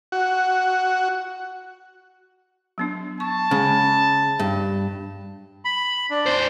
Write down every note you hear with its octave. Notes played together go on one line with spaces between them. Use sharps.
F#4
F#3 B3 D4
A5 C#6
C#3 G#3
G2
B5
D4
E2 C5